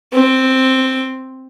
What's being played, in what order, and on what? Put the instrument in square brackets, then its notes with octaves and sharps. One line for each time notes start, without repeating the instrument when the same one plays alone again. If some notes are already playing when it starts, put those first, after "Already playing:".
[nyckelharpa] C4